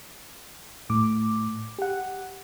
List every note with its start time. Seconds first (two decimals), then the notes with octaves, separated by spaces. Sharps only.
0.90 A2 D6
1.79 G4 F#5